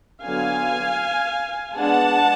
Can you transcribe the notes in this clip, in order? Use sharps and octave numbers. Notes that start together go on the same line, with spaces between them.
D3 F#3 B3 F5 G#5
G#3 B3 D4 F#5 A5